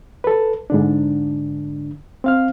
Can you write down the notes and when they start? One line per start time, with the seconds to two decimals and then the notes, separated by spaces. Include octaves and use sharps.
0.24 A4 B4
0.70 G#2 D3 D4
2.24 C4 F5 F6